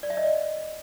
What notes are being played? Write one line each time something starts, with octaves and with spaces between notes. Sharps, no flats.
D5
E5
D#5
D5